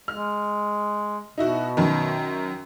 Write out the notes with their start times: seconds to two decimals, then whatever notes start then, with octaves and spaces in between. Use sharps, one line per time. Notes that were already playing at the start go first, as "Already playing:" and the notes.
0.08 G#3 F6
1.38 B2 D#4 E4 F#4
1.77 F#2 D#3